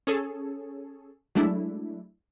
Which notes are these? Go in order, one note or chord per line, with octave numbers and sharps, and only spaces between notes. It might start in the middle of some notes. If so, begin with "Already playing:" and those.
C#4 G#4 A4 C#5
F#3 G#3 A3 D4 E4